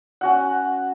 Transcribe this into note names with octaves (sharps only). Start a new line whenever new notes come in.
C#4 F#4 F#5